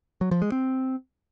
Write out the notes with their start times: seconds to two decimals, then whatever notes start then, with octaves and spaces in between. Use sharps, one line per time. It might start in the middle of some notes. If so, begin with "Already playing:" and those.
0.21 F#3
0.31 F3
0.42 G#3
0.52 C4